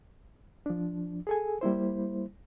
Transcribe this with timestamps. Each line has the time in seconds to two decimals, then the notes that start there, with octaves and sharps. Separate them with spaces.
0.66 F3 D4
1.27 G#4 A4 G#5
1.61 G3 A#3 E4 C5